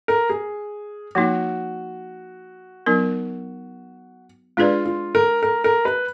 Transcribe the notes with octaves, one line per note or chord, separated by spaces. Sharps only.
A#4
G#4
F3 A#3 D#4 F#4
F#3 B3 D#4 A#4
G#3 D4 F4 G#4 B4 D5
F4
A#4
A#4
A#4
B4